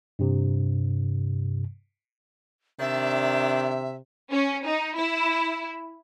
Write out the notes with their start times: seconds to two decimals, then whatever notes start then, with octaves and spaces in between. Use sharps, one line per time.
0.19 G2 C3
2.80 C3 D#3 D4 E5
4.32 C#4
4.66 D#4
4.97 E4